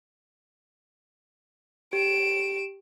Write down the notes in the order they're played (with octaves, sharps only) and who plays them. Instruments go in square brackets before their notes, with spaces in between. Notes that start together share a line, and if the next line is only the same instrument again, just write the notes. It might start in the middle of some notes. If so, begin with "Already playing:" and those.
[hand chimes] G4 [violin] D7 E7